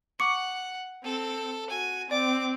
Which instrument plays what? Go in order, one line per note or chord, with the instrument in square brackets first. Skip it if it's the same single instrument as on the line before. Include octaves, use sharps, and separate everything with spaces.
[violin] F#5 [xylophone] C#6 D6 C#7
[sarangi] C4 [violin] A4
[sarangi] F#4 [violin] G#5
[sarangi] C4 [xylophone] D5 [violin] D6